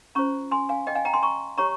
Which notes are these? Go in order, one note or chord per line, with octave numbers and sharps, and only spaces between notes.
C#4 F4 C5 A#5 C#6
G#5 C6
F5 G#5
D#5 G5
F5 G#5
G5 A#5
G#5 C6
A#5 C#6
G4 C#5 A#5 C#6